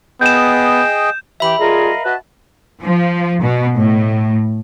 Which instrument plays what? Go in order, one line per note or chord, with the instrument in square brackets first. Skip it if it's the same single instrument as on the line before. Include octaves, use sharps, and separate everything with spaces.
[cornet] B3 [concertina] G#4 D#5 G5 [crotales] G6 E7
[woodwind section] E3 [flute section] G4 [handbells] E5 B5
[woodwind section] G3 F4 G#4 [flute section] A#4 D#5 F5
[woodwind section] F#4 B4 D#5 [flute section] A5
[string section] F3
B2
A2